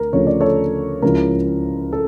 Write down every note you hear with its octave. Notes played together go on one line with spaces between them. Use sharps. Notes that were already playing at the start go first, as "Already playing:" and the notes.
Already playing: D2 A3 A#4
D2 C#3 F3 A3 C#5
D5
A4 C#5
C#2 C#3 F3 C#4 E4 A#4
A4